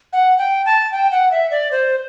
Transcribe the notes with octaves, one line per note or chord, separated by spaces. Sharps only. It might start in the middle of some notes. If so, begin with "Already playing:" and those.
F#5
G5
A5
G5
F#5
E5
D5
C5